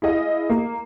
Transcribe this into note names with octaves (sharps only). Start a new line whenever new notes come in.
E4 G#4 D#5 F5
A#3